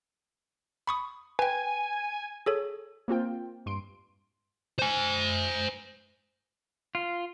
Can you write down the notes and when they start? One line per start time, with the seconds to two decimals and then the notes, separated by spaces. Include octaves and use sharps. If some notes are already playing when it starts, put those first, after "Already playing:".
0.87 B5 C#6 D#6
1.39 B4 G5 G#5
2.46 G#4 A4 C#5
3.08 A#3 C4 F4 G5
3.66 G2 C6 D7
4.79 C5 G#5
6.95 F4